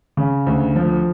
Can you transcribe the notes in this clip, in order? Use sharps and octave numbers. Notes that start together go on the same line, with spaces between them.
C#3
D2
F3